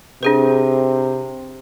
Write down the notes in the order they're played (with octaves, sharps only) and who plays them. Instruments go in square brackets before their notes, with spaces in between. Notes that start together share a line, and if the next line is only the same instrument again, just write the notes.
[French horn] C3 [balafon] D4 G#4 B4